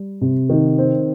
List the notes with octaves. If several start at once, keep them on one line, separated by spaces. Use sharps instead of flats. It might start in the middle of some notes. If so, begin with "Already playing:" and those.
Already playing: G3
C3
D#3
C4